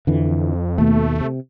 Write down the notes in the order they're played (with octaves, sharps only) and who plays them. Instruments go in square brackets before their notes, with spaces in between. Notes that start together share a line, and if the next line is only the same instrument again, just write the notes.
[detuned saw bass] F2 [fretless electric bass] D3 E3
[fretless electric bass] D#2 B2 [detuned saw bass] A3
[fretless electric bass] C3